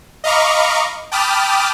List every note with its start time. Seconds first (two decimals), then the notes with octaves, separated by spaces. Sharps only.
0.24 D#5 F5 A#5 B5 C#6 D6
1.12 G5 A5 B5 D6 D#6 F6